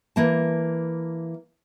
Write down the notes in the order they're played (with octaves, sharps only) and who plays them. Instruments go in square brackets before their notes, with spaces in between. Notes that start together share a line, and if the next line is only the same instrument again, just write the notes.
[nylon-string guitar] E3 A#3 A5